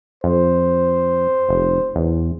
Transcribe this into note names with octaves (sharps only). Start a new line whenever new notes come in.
F2 C5
F1
E2